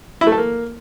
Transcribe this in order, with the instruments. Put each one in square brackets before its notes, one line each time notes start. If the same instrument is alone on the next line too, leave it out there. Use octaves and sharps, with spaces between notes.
[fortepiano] E4
A3
A4
A#3